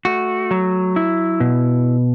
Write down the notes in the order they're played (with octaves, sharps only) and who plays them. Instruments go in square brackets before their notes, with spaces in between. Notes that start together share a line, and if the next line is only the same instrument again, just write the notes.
[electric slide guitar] A3 F#4
F#3
E4
B2